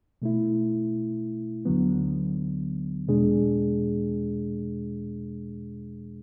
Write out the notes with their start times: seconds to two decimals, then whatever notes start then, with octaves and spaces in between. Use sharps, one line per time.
0.22 B2 A3 E4
1.65 D2 D3 F#3 B3
3.07 E2 B2 G#3 D4 G#4